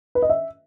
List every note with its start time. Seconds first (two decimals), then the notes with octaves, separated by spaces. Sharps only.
0.15 B4
0.22 D#5
0.30 E5